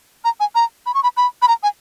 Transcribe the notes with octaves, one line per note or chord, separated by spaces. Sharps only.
A#5
G#5
A#5
B5
C#6
B5
B5
B5
A#5
G#5